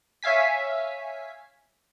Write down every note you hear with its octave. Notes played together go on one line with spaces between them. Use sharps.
C#5 E5 F5 G#5 B6